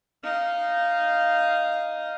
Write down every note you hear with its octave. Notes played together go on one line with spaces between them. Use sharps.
D#4 F5